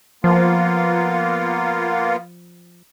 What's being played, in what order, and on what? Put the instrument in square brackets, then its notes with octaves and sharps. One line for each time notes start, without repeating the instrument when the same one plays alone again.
[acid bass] F3 [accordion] A#3 B3 F4